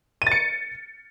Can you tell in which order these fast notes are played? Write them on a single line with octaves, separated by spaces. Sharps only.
D#7 A6 C#7